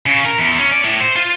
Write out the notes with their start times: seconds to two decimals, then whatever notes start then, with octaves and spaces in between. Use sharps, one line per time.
0.06 C#3
0.25 A#4
0.38 E2
0.58 C#4
0.71 D5
0.84 A2
1.00 C5
1.16 F4